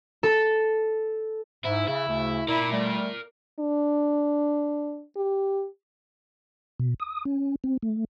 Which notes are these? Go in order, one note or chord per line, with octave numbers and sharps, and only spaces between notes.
A4
G#2 E4
C#3 E4
D2 C#3 A3
E4 A#4 D5
G3 A3
D4
G4
B2
D#6
C#4
C4
A3